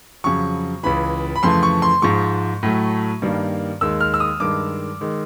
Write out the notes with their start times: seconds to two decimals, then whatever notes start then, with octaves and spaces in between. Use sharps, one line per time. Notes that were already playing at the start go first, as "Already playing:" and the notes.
0.24 F2 C#3 F#3 C#6
0.83 C#2 C#3 E3 B5
1.36 B5
1.43 F2 C#3 E3 A3 C6
1.63 C#6
1.82 C6
2.02 G#2 F3 G#3 C#6
2.63 A2 F#3 A3
3.22 G2 D#3 G3 A#3
3.81 D#2 D#3 G#3 E6
4.00 F6
4.14 E6
4.20 D#6
4.40 G2 D#3 G#3 D6
5.01 D#3 G#3